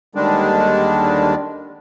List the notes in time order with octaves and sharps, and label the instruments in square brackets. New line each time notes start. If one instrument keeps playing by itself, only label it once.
[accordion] D#2 D3 D#3 G3 G#3 D4